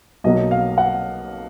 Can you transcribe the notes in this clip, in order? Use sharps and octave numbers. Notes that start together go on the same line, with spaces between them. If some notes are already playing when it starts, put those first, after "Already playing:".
B1 B2 F#3 A#3 D#5
F5
F#5